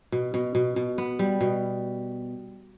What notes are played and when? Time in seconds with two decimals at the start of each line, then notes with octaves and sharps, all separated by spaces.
0.12 B2
0.34 B2
0.55 B2
0.76 B2
0.98 B3
1.19 G3
1.41 B2